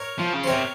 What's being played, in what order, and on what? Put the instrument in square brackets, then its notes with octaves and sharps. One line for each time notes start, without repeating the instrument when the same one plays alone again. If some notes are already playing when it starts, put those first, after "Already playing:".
Already playing: [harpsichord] A#4 C#5
[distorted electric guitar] F3
C#3
[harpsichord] C5
[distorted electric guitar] C3 [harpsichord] A#4 C#5